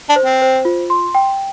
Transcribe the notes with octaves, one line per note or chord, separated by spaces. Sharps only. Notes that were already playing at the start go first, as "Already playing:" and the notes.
D4
C5
C4
C5
F4
C6
G5